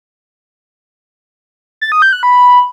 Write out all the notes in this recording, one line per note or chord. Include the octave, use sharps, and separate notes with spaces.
A6
D#6
G6
F#6
B5